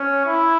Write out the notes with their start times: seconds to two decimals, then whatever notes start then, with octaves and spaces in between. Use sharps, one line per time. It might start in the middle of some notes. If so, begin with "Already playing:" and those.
Already playing: C#4
0.26 E4